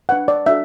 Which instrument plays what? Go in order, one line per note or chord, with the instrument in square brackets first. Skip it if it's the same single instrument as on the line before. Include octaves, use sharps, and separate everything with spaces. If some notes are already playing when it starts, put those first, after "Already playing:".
[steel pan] D4 B4 F#5
D5
D4 F#4 A4 E5